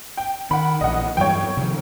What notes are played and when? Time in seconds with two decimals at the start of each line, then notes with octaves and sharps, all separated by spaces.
0.17 G5
0.51 D#3 F#5 B5
0.81 A#1 E3 D#5 F#5
1.17 G2 E3 F#3 C#5 G5
1.57 C3 D#3 F3